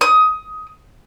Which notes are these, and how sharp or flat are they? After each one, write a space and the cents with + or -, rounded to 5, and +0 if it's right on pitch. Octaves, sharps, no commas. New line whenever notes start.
D#6 +15